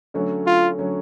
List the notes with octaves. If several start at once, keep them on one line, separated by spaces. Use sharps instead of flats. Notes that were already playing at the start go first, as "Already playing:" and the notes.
D3 F#3 A3 C#4
F4
D3 F#3 A3 C#4